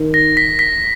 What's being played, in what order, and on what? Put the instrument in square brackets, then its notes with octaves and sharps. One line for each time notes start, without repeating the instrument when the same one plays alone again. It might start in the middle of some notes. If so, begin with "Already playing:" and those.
Already playing: [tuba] D#3
[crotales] A#6
B6
B6